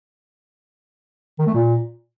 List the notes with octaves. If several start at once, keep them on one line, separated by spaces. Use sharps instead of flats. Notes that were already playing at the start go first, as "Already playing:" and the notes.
D#3
A3
A#2